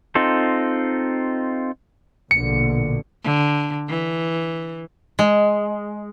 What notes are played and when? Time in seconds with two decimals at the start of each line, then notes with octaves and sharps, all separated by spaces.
0.15 C4 D#4 F4 A4
2.31 A#1 B2 D3 C#7
3.24 D3
3.89 E3
5.19 G#3